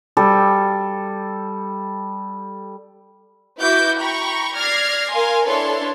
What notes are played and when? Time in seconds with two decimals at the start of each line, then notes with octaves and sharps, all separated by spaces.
0.17 G3 A4
3.60 E4 F#4 B4 E5 D6 G6
3.98 G5 A#5 B5 C#6
4.55 D5 F6 G#6 A#6 C7
5.10 A#4 F5 G#5 C6
5.45 D4 E4 A4 B4 C#5 C6